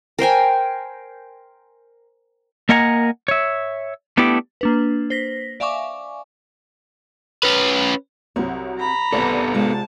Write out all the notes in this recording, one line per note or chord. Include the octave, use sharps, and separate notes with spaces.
A#4 C5 G5 G#5
A#3 A#4 D#5 F#5 G#5 A#5
C#5 E5
A3 B3 D4 E4 G4
A#3 D4 B4
C5 A#6 B6
D5 E5 F5 G#5 C#6 D6
C#4 B4
C2 F#3 C4 F#4
A#5 B5
C2 B3 A4 B4 C5 D5
C3 G#3 F4 A5